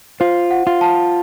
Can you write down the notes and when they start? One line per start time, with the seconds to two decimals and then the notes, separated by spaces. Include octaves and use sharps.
0.20 F4 C5
0.51 F#5
0.67 F4
0.81 A5